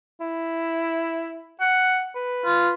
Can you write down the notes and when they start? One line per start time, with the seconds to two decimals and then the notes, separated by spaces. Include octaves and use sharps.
0.20 E4
1.60 F#5
2.15 B4
2.45 F4